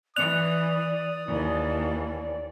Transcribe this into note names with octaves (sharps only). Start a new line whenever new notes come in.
E3 D5 D#6 F#6 F7
D#2 E3